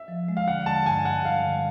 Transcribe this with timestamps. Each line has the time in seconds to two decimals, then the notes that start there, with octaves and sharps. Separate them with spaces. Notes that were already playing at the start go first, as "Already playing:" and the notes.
Already playing: E5
0.08 F3
0.28 G#3
0.37 F5
0.47 D3 F#5
0.66 D3 A5
0.86 G2 G#5
1.05 G2 F#5
1.25 G3 F5
1.45 D3